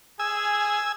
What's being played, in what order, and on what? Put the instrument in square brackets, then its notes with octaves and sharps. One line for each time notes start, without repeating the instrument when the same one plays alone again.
[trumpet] G#4 [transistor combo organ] G#5 E6